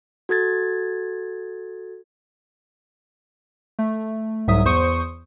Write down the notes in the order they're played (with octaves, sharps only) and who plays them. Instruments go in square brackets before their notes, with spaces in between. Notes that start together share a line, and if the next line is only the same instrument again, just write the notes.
[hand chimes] F#4 A4 G#6 A6
[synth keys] A3
C2 G#2 F#3 E5 D#6
E2 C5 C6 C#6 D#6 C#7